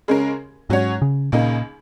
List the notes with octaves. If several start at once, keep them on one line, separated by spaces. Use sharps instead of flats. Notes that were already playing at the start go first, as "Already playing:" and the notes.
C#3 G#3 C#4 A#4
G#2 F#3 C#4 F#4 C#5
C#3
C#2 A#2 C#3 A#3 D#4